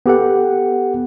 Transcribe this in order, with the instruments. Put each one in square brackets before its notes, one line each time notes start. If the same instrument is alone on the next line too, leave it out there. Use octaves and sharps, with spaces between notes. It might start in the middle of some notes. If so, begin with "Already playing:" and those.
[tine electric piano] B3 G4 A4 F#5